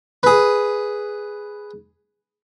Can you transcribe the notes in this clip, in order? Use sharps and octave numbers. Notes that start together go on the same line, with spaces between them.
G#4 B4